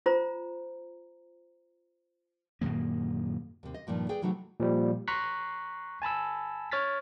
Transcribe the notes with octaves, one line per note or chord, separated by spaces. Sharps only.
F4 C5 A#5
F#2 A#2 D#3 A#3
D#2 C3
D#5
G2 A#2 D#3 F3
G#4 B4 D5 G5
C3 E3 F#3 A3 D#4 F#4
A#2 F3 G3
A#5 C6 C#6 F#6 B6 C7
G#5 A5 B5 E6
C#5 F6 A6 B6